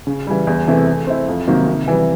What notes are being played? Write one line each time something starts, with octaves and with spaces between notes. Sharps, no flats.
C#3
E3 G3
E2
C3 E3 A3
A3
C4 E4
F2
C3 D#3 F#3 A#3
C3
E3 G3